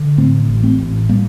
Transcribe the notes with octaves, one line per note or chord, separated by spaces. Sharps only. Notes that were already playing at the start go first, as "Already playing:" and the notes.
Already playing: D3
A2 A3 C4
A1
A3 C4
A2
A#2 G3 A#3